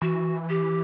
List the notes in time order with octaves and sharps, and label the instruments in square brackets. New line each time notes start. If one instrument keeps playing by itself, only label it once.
[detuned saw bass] E3 [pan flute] F#4
[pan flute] G4